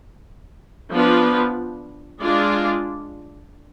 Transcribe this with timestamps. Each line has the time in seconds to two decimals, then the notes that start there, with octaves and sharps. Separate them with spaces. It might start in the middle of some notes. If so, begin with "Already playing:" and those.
0.92 F3 B3 D4 F4 B4
2.21 G#3 D4 F4 G#4 D5